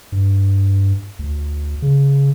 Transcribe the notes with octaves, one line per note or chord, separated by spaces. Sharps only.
G2
D2
C#3